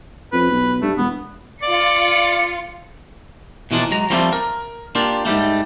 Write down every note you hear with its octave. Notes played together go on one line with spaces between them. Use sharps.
F2 B4
B1
G2 A3
E1 B3
F4 D5 C#7
B2 E3 F3 A#3 D4
F#3 G#3 A#5
F3 G3 A3 A#3 C4 F4
A#4
A#3 D4 F4 G4
G#2 C#3 G3 A3